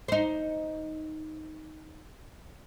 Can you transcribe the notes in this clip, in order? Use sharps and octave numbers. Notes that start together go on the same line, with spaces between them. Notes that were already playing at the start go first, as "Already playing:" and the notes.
D#4 C5